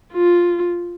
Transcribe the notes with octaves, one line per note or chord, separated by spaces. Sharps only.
F4